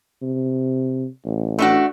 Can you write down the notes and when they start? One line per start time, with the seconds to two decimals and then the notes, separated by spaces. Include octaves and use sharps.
0.22 C3
1.25 A1
1.59 A3 D4 F#4